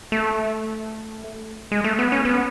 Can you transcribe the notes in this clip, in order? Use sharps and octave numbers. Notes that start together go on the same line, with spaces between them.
A3
G#3
A3
B3
C#4
B3